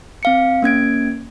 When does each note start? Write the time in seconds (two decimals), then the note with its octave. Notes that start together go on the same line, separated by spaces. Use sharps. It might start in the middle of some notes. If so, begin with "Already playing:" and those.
0.23 C4 F5 C#7
0.62 A#3 C#4 G#6 D7